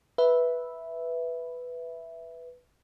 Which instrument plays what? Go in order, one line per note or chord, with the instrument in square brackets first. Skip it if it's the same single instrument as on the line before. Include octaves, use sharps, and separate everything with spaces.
[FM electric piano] B4 E5